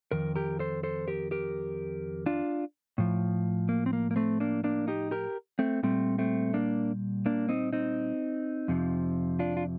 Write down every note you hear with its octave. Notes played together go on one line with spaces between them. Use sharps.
F2 D#3 A#4
G4 A#4
A4 C5
A4 C5
G4 A#4
G4 A#4
D4 F4
A2 F3
A#3
C4
A#3
A#3
A3 C4
A#3 D4
A#3 D4
D#4 G4
G4 A#4
A3 C4
A#2 G3 A3 C4
A3 C4
A#3 D4
A#3 D4
C4 D#4
C4 D#4
F2 C3 F3
D4 F4
F4